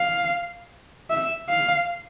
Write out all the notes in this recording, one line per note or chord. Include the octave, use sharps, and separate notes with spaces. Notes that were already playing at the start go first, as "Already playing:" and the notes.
Already playing: F5
E5
F5